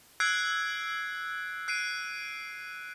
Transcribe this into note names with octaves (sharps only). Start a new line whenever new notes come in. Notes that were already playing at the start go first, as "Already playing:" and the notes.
E6 F#6 G#6 C7 D7
F#6 C7 D7 D#7